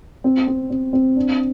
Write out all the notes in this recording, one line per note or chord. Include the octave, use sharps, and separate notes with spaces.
C4
C4
C4
C4
D4